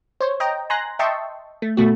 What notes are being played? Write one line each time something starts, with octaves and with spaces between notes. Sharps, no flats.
C5 C#5
D#5 G5 A#5
G#5 A#5 C6 F#6 A#6
D#5 E5 G5 A5 C6 C#6
A3
B2 A3 F#4